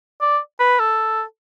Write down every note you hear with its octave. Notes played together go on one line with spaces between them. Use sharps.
D5
B4
A4